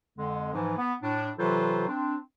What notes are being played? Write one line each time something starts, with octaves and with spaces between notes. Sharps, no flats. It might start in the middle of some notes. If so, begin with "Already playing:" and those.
F2 D3 G#3
G#2 E3 F3
B3
A2 D4
C3 E3 F#3 F4 A4 C5
C4 D4